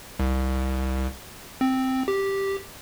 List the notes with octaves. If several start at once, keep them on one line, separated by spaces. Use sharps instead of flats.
C2
C4
G4